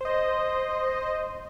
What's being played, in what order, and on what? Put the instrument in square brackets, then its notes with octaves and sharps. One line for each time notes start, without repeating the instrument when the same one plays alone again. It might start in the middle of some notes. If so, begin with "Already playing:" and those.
[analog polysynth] C5 D#5